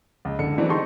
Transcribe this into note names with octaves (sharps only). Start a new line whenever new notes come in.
C#2
F#1 D3 C#7
E3 F#3 G#3 C4 D4
D#4 G4 G#4 A5 C6 C#6